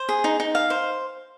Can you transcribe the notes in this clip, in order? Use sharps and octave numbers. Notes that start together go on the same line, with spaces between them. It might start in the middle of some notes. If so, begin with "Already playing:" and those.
Already playing: C5
G#4
D#4
D#4
F5
C5